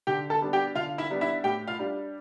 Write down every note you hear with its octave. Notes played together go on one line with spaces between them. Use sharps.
D3 G4 G5
A4 A5
G3 B3 D4
G4 G5
D3 F4 F5
E4 E5
G3 B3 D4
E4 E5
A2 G4 G5
F4 F5
G3 D4